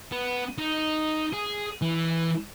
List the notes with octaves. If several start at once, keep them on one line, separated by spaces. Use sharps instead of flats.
B3
D#4
G#4
E3